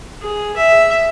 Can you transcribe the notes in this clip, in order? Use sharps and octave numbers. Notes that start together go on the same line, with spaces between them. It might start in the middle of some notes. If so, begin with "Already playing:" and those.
G#4
E5